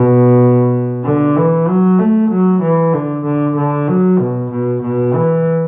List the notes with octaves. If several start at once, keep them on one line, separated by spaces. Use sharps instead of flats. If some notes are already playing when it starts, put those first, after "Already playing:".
Already playing: B2
D3
E3
F#3
A3
F#3
E3
D3
D3
D3
F#3
B2
B2
B2
E3